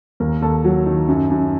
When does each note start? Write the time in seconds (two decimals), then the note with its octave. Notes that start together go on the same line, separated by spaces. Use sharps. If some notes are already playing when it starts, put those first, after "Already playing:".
0.20 D#2 A#4
0.42 D#2 A4
0.64 F#3
0.86 D#3
1.08 F#2
1.30 F#2